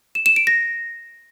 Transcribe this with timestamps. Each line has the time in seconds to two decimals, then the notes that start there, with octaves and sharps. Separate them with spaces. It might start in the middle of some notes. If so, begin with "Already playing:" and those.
0.15 E7
0.26 E7
0.36 D7
0.47 A#6